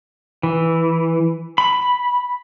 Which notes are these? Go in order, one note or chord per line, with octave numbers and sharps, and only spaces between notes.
E3
B5